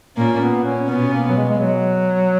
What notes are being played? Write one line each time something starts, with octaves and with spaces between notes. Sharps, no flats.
A#2 A#3 C#4
B3
C#4
B2 B3 C#4
A#3
F#3
G#3
G#3
F#3